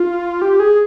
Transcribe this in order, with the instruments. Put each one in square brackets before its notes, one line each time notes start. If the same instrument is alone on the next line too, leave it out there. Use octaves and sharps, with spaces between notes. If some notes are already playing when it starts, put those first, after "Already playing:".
Already playing: [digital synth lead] F4
G4
G#4